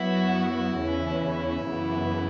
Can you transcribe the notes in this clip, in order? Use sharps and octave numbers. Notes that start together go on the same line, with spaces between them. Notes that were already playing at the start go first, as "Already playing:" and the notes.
Already playing: F#2 F#3 B3 E4 F#4
E2 C#3 E3 C#4
F#2 C#3 E3 B3